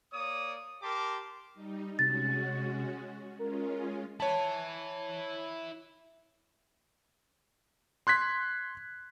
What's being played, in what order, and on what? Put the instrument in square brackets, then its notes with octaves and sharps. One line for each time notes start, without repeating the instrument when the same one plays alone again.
[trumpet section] A#3 C#5 D5 D#6
G4 A#4 A5 C6 D6
[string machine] G3 D#4
[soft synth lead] C3 [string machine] G#3 C#4 F#4 [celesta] A6
[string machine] G#3 C#4 F4 [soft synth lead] A#4
[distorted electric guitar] E4 B4 [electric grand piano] C#5 A5
[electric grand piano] C6 F#6 G#6 B6